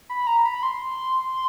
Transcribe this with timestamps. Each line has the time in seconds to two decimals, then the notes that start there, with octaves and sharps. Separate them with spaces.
0.09 B5
0.27 A#5
0.45 B5
0.63 C6